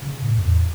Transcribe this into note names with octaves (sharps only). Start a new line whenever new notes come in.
C#3
A2
F#2
E2